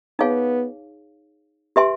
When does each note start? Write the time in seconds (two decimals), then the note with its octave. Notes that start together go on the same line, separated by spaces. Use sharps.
0.19 B3 D#4 G#4 C#5 F5 G#5
1.76 G4 B4 E5 G#5 C6